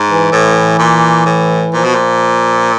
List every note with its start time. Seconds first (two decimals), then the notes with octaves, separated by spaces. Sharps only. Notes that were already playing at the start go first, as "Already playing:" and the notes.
Already playing: G#2
0.09 E3
0.32 A2
0.79 A#2
1.26 A2
1.73 A#2 F3
1.84 B2
1.95 A#2